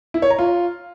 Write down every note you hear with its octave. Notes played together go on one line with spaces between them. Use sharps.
E4
C#5
A#5
F4